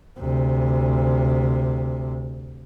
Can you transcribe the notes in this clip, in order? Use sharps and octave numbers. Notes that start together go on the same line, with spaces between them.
D2 C3